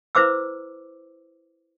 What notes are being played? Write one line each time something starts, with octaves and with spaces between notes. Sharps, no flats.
E4 B4 C5 D6 E6